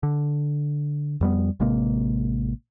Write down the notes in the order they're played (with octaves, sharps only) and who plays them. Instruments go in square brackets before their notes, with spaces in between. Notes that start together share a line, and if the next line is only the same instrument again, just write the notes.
[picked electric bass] D3
F2 G3 B3
A1 C3 G#3 A#3